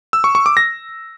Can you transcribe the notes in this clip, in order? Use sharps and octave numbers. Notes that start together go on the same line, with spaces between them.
E6
C#6
C#6
D6
A#6